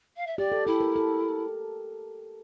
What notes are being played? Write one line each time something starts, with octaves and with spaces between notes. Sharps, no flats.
F5
E5
G4 D5
A4
E4 A4
A#4
A4